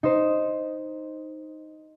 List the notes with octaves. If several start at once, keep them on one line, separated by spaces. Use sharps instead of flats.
D#4 C5